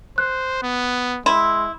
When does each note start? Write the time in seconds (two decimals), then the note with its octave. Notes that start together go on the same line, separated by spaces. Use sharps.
0.18 C5 F#6
0.63 B3
1.26 G#3 E4 C6